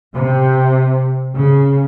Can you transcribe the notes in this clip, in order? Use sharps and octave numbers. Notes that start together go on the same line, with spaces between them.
C3
C#3